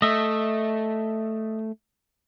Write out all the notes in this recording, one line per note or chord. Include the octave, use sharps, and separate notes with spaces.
A3 D#5 E5